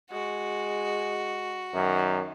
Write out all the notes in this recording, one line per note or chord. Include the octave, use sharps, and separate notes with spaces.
G#3 F#4
F#2 D#3